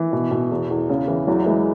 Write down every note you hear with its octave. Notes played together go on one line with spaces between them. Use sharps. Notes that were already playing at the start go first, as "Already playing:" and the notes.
Already playing: E3
B2
B2
E2
E2
C#3
E3
E2 F#3
E3 G#3